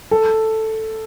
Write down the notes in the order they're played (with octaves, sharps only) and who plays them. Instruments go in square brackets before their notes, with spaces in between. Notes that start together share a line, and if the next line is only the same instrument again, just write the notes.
[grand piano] A4